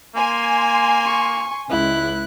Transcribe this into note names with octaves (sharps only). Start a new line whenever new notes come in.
A#3 G#5 C6
C#6
C#2 E4 F#6